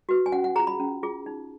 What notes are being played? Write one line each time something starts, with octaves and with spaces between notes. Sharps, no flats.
F#4 B4
G#5
C#4 F#5
F#5
F4 G#4 A#5
B5
C#4
F4 G#4
D#4